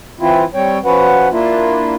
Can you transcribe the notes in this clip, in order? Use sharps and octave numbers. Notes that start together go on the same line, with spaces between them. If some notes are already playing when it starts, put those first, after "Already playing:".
E3 C4 E4 F4
G3 C4 C#5 G5
F3 C#4 F#4 B4 F#5
A#3 D4 E4 F4